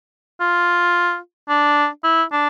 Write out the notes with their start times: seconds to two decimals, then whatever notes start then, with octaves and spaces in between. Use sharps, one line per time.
0.40 F4
1.49 D4
2.04 E4
2.32 D4